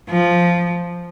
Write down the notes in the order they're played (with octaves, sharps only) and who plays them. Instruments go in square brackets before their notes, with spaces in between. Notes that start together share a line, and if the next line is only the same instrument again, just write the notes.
[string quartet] F3